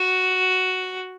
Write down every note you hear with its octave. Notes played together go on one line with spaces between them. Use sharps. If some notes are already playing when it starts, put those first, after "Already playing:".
Already playing: F#4